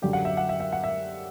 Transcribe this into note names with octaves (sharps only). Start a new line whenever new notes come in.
F#2 D3 F#3 G4
F#5
E5
F#5
E5
E5
F#5
E5